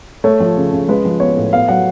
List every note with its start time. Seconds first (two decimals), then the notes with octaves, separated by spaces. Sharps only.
0.24 A3 C#5
0.40 F3
0.57 C#3
0.73 C#3
0.89 G#3 B4
1.05 F3
1.20 B3 C#5
1.36 A2
1.53 B3 F5
1.68 F#3 F#5